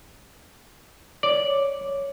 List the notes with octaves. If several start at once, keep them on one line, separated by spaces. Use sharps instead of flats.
C#5 D5